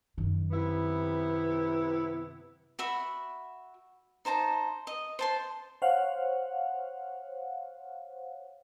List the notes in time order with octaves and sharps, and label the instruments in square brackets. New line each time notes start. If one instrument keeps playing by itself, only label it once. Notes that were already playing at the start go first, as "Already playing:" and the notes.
[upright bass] F#2 D#3
[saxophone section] C3 B3 E4
[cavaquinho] F#4 E5 B5
D#4 C5 A5 A#5
D#5
C5 A5 C6
[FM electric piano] C5 C#5 F5 F#5